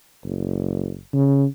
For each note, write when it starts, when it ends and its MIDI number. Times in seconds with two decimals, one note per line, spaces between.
0.24 0.97 30
1.14 1.46 49